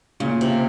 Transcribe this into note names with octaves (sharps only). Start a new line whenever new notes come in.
A#2 C#3
C3